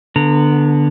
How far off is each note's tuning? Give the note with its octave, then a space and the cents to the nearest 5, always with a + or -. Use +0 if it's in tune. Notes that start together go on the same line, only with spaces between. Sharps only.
D3 +0 B3 -15 A#5 -25